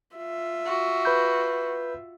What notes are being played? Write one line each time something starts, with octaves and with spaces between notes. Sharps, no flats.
F4 E5
F#4
B4 B5 G6